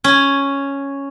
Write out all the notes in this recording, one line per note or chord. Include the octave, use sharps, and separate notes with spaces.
C#4 G#5